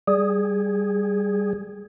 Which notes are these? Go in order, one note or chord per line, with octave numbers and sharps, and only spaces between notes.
G3 G#4